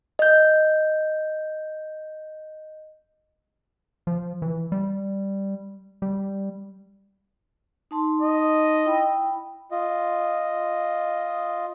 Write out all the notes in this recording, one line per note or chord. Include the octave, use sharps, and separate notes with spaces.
D#5 G6
F3
E3
G3
G3
D#4 A5 C6
D#5
E4 G5 B5
F4 D#5